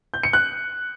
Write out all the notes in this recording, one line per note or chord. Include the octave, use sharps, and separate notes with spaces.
G6
C#7
F#6